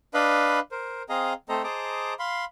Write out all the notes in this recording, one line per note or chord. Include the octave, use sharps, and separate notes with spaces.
D4 B4 D#5 F5 B5
A#4 C5
C4 G#4 D#5 F5 A#5
A3 C4 A4 C5 D#5 A#5
G#4 C5 D#5 A5 A#5 D6
F5 B5 C6